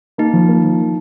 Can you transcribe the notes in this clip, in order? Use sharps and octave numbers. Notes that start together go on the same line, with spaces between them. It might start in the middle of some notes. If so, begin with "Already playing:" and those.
A#3 D#4
F3
A#3
F3